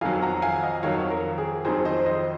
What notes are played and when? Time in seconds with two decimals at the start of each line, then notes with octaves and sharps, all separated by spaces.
0.01 F2 D#3 F#3 F5 G#5
0.22 F#5 A#5
0.42 F5 G#5
0.63 D#5 F#5
0.83 F2 D#3 F#3 C#5 F5
1.10 A#4
1.38 G#4
1.65 F2 D#3 F#3 G#4 C5
1.85 C5 D#5
2.05 C5 D#5